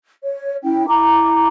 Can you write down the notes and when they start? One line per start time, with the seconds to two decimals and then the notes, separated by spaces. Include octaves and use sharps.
0.23 C#5
0.64 C#4 E4 G5
0.87 E4 A#5 D6